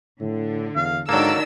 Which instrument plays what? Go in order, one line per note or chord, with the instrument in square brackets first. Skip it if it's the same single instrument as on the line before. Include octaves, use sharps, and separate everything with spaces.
[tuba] A2 [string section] D3
[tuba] E2 [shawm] F5
[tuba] G#2 [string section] D#3 D4 E6 [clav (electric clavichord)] F#3 A#3 [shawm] A4